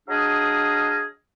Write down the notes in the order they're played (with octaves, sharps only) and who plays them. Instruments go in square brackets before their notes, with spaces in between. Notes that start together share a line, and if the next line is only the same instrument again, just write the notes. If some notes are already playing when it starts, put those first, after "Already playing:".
[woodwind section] F#3 D4 G#4 D#5 F5